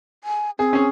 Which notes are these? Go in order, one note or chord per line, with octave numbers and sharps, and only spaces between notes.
G#5
C4 G#4
C#4 G#4